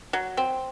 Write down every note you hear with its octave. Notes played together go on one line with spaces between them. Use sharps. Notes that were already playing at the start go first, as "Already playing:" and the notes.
F#3
C4